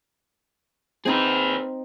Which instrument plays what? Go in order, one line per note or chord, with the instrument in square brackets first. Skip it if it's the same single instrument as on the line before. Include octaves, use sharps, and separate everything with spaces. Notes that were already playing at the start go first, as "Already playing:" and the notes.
[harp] C4 D#4 [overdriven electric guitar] G#4 B4